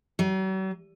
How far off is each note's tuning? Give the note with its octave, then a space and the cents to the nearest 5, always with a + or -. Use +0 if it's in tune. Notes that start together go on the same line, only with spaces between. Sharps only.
F#3 +45